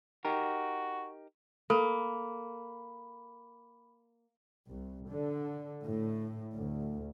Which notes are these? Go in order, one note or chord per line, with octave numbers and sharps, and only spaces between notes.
D#4 F#4 G4 A#4
A#3 A4 B5
C2
D3
A2
D2